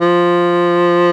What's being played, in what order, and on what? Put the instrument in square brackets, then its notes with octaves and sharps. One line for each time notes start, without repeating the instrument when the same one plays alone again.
[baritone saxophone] F3